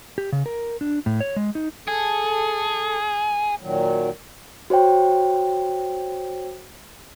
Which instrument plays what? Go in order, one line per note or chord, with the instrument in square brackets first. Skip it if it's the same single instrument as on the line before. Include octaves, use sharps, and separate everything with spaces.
[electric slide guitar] G4
C#3
A#4
D4
A2
C#5
G#3
D#4
[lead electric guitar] G#4 [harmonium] A4
[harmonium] A#2 D#3 F#3
[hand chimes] F#4 C5 C#5 G5